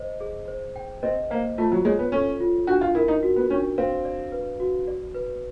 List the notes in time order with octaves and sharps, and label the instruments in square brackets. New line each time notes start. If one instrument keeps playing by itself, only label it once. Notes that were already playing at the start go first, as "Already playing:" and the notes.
Already playing: [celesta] C5 D#5
G#4
C5
G5
[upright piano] C4 [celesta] D#5
[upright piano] A#3 [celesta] C5
[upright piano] A3 [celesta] F4
[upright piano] F#3
[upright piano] G#3 [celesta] C#5
[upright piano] B3
[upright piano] C#4 [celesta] A4
[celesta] F4
[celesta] D4 [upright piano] F#4
[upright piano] F4
[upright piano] E4 [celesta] A#4
[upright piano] D#4
[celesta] F#4
[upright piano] B3
[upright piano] C#4 [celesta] D4
[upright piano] C4 [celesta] F5
[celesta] D5
B4
F#4
D5
B4